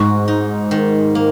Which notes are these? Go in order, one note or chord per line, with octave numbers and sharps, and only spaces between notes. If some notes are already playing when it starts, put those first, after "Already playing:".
Already playing: G#2 F#4
D#4
D#3
A#3